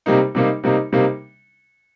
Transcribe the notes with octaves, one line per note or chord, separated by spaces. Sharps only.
C3 G3 A#3 D#4
C3 G3 A#3 D#4
C3 G3 A#3 D#4
C3 G3 A#3 D#4